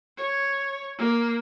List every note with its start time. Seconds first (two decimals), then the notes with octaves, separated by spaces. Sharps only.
0.17 C#5
0.98 A#3